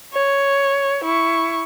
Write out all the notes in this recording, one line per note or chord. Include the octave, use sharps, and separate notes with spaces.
C#5
E4 C#6